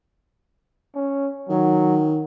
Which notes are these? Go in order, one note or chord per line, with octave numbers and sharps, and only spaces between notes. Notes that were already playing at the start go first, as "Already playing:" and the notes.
C#4
D#3 F#3